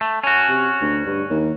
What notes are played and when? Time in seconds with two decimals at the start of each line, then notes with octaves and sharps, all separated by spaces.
0.01 A3
0.24 C#4 F#4
0.49 C3
0.82 D2
1.06 G2
1.30 D#2